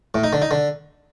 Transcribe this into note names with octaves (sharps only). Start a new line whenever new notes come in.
A2
D#4
D3
D#4
D3